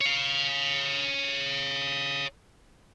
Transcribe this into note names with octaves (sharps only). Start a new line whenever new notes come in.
C#5 F5